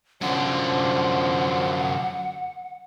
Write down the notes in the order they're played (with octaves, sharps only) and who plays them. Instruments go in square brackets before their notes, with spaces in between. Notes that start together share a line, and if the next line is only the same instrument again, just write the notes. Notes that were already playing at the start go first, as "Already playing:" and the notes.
[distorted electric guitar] F#2 D3 [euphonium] F3 [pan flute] F#5